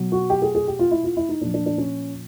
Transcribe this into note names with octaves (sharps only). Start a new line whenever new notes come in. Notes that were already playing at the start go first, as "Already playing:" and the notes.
Already playing: B2 F#3
F#4
G4
G#4
G#4
G4
F4
E4
F4
E4
D#4
A#2 F3 D4
D4
D4
C#4